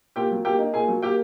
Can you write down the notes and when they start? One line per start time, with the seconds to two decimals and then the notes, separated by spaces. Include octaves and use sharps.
0.16 A#2 G4 G5
0.31 F#3
0.45 A#3 G4 G5
0.59 D#4
0.74 A#2 G#4 G#5
0.88 F#3
1.02 A#3 G4 G5